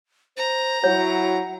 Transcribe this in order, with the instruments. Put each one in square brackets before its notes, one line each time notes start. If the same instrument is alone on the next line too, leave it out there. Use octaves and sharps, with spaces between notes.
[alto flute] C5 [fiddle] A#5
[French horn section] F#3 E4 F#4 [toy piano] C#5 [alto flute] F#5